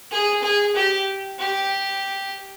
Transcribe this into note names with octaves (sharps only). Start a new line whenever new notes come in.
G#4
G#4
G4
G4